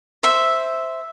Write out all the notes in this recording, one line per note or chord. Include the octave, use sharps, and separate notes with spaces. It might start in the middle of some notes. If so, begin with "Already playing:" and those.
C5 E5